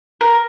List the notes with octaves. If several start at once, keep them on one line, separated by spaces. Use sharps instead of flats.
A#4